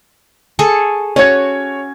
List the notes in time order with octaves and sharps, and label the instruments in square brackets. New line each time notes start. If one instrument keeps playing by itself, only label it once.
[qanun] G#4 A4 C#6
[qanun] C#4 F#4 [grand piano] C#5 G#6